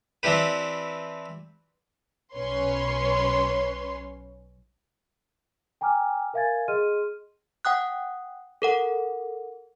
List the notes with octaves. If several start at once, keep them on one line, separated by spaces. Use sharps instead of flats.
E3 C4 D4 E4 G4 B4
B1 C#4 B4 C#5 C6
G5 G#5 A#5 D6 F6
A#4 E5 F5 G#5 G#6 A6
G#4 D#5 C6 F6 D#7
F#5 G5 D#6 F#6
A4 A#4 F#5